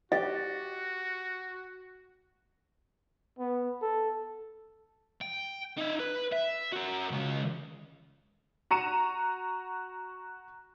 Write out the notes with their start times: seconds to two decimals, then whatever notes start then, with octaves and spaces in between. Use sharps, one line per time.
0.12 F#4 G4 D#5
3.39 B3
3.82 A4
5.21 G5
5.78 D#4 E5
6.00 B4
6.32 E5
6.72 F#4 A#4
7.11 C#3 G#3
8.71 F#4 A#5 C#7 D#7 E7